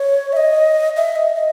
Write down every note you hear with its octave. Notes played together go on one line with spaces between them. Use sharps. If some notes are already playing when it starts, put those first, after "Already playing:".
Already playing: C#5
E5
D#5
E5
D#5
D#5